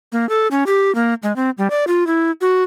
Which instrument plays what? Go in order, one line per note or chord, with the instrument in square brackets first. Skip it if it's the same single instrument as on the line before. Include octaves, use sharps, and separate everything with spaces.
[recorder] A#3
A4
C#4
G4
A#3
G#3
C4
G3
D5
F4
E4
F#4